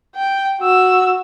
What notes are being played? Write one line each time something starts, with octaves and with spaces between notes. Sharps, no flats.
G5
F#4 E6